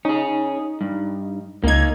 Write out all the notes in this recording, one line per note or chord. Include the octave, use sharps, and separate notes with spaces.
C#4 D#4 G#4
G2
C#2 A#3 D#4 G#6